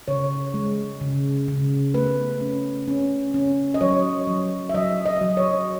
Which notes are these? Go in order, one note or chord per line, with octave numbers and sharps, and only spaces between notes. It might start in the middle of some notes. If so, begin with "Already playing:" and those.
C#3 C#5
G#3
C#3
C#3
A3 B4
C#4
C#4
C#4
D#5
F#3 C#5
F#3
E5
F#3 D#5
D#5
F#3
C#5